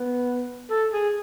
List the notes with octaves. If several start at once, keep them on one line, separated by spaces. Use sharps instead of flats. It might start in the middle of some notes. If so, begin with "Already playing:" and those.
Already playing: B3
A4
G#4